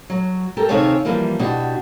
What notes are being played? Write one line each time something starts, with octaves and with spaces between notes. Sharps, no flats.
F#3
G4 A4 A#4
C3 D#3 C4 G#4 C#5 F5
E3 F3 G3 A#3
B2 D4 F#4 G4